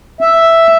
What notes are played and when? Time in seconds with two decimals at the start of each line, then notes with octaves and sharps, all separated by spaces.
0.21 E5